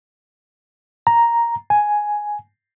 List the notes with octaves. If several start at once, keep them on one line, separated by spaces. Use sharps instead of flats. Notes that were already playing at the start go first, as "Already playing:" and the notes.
A#5
G#5